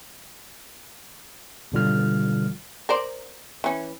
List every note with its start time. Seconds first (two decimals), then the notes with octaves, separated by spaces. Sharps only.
1.72 G#1 B2 D3 G3 F4 F6
2.89 A#4 C5 D5
3.64 E3 C#4